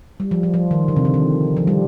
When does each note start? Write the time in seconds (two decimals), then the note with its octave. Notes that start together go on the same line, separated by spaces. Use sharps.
0.20 G3
0.31 F3
0.43 F3
0.54 F3
0.71 D#3
0.88 D3
0.96 C3
1.05 D3
1.14 D#3
1.57 F3
1.67 G3